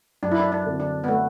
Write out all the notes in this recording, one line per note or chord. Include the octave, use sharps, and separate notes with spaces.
F#2 D4
E4
D4
D4
D3 F#3 C4
D4
B3
A3